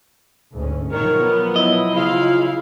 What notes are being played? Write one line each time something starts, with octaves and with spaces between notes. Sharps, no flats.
D2 G#2 C#4
B2 D#3 F3 F#3 A#4 C#5
B3
E4 D#5
C#3 E4 F4 F5